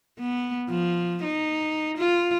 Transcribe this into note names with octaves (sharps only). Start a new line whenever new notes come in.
B3
F3
D#4
F4